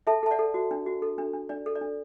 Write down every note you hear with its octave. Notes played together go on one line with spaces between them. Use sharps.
A4 E5 A5
A4 A5
D5 F#5
A4
F#4
D4
F#4
A4
D4
D4
D4 D5
A4
D5
D4